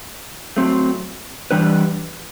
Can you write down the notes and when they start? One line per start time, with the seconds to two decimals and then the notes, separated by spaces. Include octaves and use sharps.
0.57 F#3 A3 C4
1.51 E3 G3 D4 G4 B4